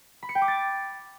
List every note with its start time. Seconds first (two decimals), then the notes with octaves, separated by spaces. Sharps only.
0.23 B5
0.29 C#7
0.35 G5
0.42 D6
0.48 A6